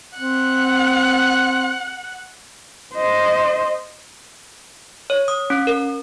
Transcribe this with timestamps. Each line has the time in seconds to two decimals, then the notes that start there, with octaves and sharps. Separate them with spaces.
0.18 C4 F#5
2.95 C5 D#5
5.10 C#5
5.28 D#6
5.50 C#4
5.67 A#4